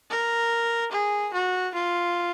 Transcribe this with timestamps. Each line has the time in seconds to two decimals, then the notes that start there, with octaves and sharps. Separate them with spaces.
0.10 A#4
0.92 G#4
1.33 F#4
1.74 F4